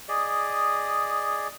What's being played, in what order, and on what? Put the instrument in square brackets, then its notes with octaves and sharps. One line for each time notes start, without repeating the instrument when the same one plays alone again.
[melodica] G#4 D5 D#5